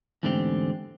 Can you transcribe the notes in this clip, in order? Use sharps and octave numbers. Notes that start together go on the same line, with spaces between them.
E2 G#2 D3 A3 C4 G4